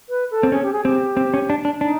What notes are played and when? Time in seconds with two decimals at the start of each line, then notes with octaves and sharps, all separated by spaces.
0.09 B4
0.30 A4
0.43 C4
0.52 C#4 G#4
0.62 G4
0.72 G#4
0.84 C4 G4
1.17 C4
1.34 C#4
1.50 D4
1.65 D4
1.81 D4 D#4